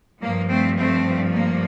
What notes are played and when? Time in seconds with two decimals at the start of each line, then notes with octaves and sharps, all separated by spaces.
0.22 G2 F3 A#3
0.49 A3 C4
0.78 A3 C4
1.34 A#3